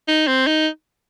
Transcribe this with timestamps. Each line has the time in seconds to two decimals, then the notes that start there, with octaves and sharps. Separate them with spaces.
0.08 D#4
0.27 C4
0.47 D#4